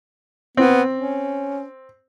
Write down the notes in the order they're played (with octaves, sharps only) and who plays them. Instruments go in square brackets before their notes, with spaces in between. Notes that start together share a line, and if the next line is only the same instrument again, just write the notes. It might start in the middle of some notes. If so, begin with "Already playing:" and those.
[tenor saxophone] B3 [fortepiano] C4
[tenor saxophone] C#4